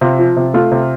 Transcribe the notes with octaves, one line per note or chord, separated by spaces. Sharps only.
C3 F4
F3
C3
A3 F4
C3